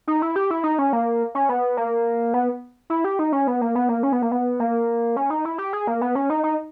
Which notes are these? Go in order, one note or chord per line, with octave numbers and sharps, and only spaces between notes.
D#4
E4
G4
E4
D#4
C#4
A#3
C#4
B3
A#3
B3
E4
G4
D#4
C#4
B3
A#3
B3
A#3
C#4
B3
A#3
B3
A#3
C#4
D#4
E4
G4
G#4
A#3
B3
C#4
D#4
D#4